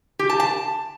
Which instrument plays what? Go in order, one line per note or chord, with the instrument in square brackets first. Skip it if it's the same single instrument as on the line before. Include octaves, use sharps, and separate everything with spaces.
[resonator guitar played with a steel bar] G4
A5
A5